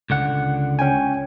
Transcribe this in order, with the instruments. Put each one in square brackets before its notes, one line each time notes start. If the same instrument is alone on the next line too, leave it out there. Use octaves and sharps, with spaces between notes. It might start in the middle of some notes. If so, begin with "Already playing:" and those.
[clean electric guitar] C#2 D3 F#5
[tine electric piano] C#4 G5 G#5